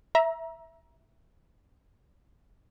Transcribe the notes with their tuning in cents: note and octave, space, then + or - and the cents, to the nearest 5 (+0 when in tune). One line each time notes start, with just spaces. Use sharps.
E5 +0 A#5 +25